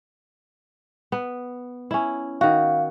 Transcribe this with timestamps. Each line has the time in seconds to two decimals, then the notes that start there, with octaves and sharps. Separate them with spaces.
1.12 B3
1.91 C#4 E4
2.41 D#3 F#4 F5